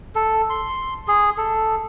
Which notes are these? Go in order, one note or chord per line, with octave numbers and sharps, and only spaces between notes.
A4
C6
G#4
A4